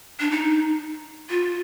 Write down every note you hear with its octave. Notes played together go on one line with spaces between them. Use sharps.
D4
D#4
F4